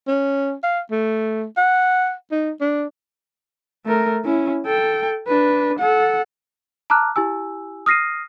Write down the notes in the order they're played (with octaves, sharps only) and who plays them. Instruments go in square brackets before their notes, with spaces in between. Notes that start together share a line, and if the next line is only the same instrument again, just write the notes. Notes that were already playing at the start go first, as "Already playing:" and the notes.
[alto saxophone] C#4
F5
A3
F#5
D#4
D4
[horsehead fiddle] A3 A#4
C#4 E4
A4 G5
D4 B4
A4 F#5
[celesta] A5 A#5 D6 F6 F#6
E4 G4 G#5 E6
D#6 F6 A#6 C7 D#7